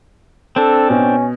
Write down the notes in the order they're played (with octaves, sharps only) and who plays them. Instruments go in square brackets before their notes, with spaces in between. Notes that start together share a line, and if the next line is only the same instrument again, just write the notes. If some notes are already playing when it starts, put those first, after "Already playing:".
[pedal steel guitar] C4 D4 [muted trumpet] A4
[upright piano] B2 [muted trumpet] C#4